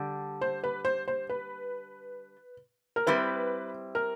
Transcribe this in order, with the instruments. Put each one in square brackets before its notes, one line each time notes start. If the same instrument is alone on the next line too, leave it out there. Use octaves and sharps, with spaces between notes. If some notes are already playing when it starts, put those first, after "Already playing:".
Already playing: [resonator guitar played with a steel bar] D3 G3
[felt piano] C5
B4
C5
C5
B4
A#4
[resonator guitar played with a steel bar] G3 C4 E4 [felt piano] B4
[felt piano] A#4